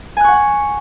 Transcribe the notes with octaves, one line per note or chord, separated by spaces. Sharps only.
F#5 G#5 C#6 F#6